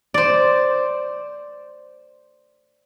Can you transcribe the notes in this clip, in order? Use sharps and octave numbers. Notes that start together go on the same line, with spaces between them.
C5 D5